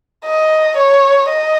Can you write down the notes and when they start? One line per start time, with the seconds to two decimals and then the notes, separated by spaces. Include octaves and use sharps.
0.25 D#5
0.77 C#5
1.29 D#5